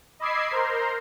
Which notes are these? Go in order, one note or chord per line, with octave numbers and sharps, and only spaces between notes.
D#5 B5 D6 E6 G#6 C7
A#4 C5 A#5 C6